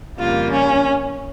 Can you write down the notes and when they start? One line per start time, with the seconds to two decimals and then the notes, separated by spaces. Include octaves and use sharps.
0.18 F2 C#3 G3 A#3 F4
0.52 C#4